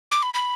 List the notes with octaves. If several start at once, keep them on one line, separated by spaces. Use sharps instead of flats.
D6
B5
B5